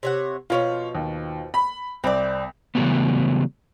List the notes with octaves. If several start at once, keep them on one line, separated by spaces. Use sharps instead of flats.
C3 C#5 F#5
B2 E3 F3 F4 C#5
D#2
B5
C2 C4 D5
C#3 E3 F#3 G3 A3 B3